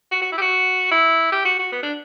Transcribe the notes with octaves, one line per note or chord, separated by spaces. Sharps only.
F#4
F#4
E4
G4
F#4
E4
G4
F#4
F#4
B3
D4